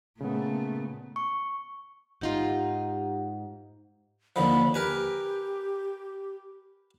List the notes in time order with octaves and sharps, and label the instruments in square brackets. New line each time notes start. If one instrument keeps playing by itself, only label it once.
[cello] A#2 A3 [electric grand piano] C#3 B3
[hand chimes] C#6
[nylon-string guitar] G#2 D#4 F4 [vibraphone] G4 F#5
[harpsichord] D#2 D3 F3 [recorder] B5
[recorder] G4 [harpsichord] A#4 B4 G#5